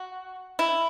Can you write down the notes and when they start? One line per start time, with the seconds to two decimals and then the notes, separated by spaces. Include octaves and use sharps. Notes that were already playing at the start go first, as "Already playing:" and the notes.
Already playing: F#4
0.59 E4